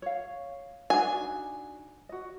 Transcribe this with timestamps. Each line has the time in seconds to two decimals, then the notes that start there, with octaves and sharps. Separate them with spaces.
0.02 C#5 F5
0.90 D4 D#4 F#4 G#5
2.09 F#4 D#5